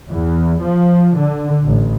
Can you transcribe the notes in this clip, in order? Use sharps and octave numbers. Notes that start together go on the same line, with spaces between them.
E2
F3
D3
A1